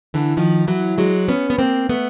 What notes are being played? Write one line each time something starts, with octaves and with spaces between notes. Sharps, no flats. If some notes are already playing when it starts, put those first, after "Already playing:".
D3 E3
D#3 F3
E3 F#3
F#3 G#3
B3 C#4
B3
A#3 C4
A3 B3